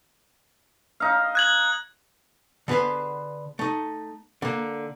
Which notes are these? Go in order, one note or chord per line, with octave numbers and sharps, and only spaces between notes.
D#4 F5
F#6 G#6 F#7
D3 B3 G#4 B4 C5
A3 D#4
D3 A#3